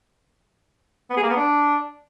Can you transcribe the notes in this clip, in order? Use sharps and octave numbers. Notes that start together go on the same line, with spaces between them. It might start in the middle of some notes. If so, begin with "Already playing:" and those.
B3
G#4
A#3
B3
D4